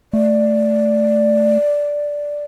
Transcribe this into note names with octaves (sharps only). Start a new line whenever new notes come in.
A3 D5